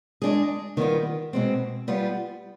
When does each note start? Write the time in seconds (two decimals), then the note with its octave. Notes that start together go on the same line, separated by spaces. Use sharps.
0.22 G#3 D4 G#4
0.77 D#3 G3 B3 F4
1.33 B2 G#3 C4
1.88 G3 B3 F4